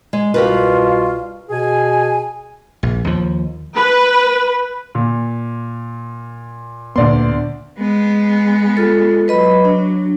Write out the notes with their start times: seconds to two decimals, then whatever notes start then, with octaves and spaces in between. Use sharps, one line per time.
0.13 G#3
0.34 C2 B2 F4 G4 A#4 B4
1.50 B2 G#4 G#5
2.83 A#1
3.05 D#2 F3
3.76 B4
4.95 A#2
6.96 D2 A#2 B3 D5 C6
7.79 G#3 B3
8.77 F4 A4
9.28 F#3 B4 D#5 B5
9.65 D4